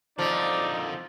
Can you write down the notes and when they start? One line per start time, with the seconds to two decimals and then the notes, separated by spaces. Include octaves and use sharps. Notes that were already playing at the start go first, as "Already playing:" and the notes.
0.19 F2 D3 F3 D#4 D5